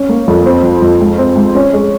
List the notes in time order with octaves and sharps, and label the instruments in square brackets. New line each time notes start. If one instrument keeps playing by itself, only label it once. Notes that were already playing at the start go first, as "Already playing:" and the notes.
Already playing: [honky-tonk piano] C#4
A#3
F2
C4
F3
F2
G#2
C4
G#2
C#4
G#3